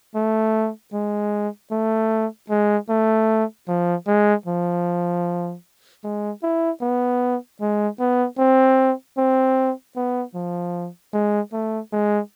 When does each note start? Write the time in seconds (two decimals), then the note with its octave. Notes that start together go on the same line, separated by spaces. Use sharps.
0.15 A3
0.93 G#3
1.72 A3
2.50 G#3
2.89 A3
3.68 F3
4.07 G#3
4.46 F3
6.04 G#3
6.43 E4
6.81 B3
7.61 G#3
7.99 B3
8.38 C4
9.18 C4
9.96 B3
10.35 F3
11.14 G#3
11.53 A3
11.93 G#3